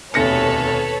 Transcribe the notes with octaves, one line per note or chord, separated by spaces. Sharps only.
F1 D#2 B2 A4 B4 C#5 A#6 C#7